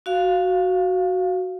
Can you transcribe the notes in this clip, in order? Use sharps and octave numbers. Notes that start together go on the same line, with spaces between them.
F#4 F5